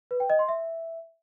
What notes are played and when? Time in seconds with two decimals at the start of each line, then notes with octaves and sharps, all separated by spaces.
0.11 B4
0.20 G5
0.30 D#5
0.39 C6
0.49 E5